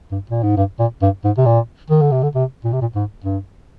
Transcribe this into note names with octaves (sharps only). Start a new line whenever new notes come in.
G2
A#2
G#2
G2
A#2
G2
G#2
C3
A#2
D#3
D3
C3
D3
C3
A#2
C3
A#2
G#2
G2